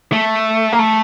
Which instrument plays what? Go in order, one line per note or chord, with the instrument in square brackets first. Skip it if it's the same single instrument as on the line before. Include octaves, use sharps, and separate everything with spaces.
[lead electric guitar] A3
A#3
A3